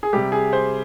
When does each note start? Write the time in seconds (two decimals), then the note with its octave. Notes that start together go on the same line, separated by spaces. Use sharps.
0.03 G#4
0.13 C3 G3 G4
0.32 G#4
0.53 C5